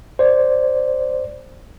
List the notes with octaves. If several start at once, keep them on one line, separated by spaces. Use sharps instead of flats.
C5 D5